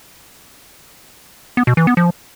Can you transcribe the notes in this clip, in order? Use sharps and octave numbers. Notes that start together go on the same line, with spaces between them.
B3
B2
E3
B3
F3